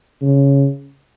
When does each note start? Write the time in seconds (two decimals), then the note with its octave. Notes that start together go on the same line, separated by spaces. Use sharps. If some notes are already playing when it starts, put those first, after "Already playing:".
0.22 C#3